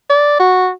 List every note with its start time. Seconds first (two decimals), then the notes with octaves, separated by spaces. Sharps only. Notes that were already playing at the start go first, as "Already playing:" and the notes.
0.10 D5
0.40 F#4